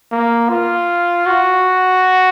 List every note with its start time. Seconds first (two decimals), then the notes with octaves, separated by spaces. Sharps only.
0.12 A#3
0.49 F4
1.26 F#4